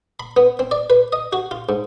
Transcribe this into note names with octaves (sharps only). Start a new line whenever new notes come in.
B5
B3
C4
D5
B4
D#5
F#4
F4
G#2